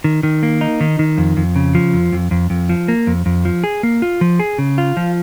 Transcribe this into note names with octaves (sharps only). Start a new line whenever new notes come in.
D#3
D#3
A#3
D#4
D#3
D#3
F2
F2
C#3
F3
F2
F2
F2
F2
F3
A#3
F2
F2
F3
G#4
A#3
F4
F3
G#4
C#3
F4
F3